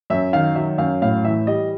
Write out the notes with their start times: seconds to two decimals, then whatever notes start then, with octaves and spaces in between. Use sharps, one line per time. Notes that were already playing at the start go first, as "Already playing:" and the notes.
0.10 F#2 E5
0.33 D#3 F5
0.56 F#3 E5
0.78 F#2 F5
1.01 A2 F5
1.24 E3 E5
1.47 G3 D#5